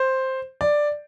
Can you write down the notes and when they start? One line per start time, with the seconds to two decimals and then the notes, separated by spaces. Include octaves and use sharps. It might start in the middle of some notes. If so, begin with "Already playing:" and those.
Already playing: C5
0.61 D5